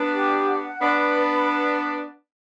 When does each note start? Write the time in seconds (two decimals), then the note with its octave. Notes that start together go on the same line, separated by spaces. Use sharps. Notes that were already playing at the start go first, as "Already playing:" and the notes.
Already playing: B3 D4
0.13 G4
0.47 F#5
0.80 B3 D4 B5
1.15 B4